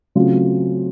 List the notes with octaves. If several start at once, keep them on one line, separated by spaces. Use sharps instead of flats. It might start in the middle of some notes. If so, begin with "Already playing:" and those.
C#3 F#3 A3 C4 F4